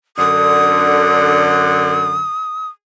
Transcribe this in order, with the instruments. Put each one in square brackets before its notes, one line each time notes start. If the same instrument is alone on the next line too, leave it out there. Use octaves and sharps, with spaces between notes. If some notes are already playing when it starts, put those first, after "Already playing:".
[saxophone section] F#2 D3 [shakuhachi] D#6